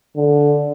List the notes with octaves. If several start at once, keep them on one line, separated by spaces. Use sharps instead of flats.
D3